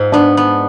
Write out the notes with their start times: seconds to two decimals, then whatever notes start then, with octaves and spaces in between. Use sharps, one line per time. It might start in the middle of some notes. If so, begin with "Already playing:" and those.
Already playing: G#2 F4
0.12 B3 D4
0.37 B3